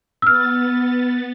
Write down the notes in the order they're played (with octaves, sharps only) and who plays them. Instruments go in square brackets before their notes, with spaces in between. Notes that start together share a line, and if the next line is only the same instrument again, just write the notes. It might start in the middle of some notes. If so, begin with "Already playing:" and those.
[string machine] B3 A6 [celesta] E6 F6